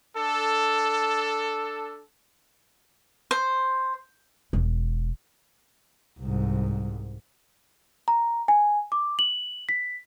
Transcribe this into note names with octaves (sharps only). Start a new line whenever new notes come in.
D4 A4
C5
E1
C2 G#2
A#5
G#5
D6
F#7
B6